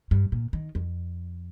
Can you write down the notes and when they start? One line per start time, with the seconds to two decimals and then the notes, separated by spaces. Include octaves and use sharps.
0.11 G2
0.32 A#2
0.53 D#3
0.75 F2